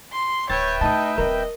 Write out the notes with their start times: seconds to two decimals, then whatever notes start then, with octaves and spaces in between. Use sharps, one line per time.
0.13 C6
0.50 D1 B4 C#5 E5 G5 A6
0.81 A3 D#4 E4 A5 D#6
1.18 D#1 C4 A#4 D#5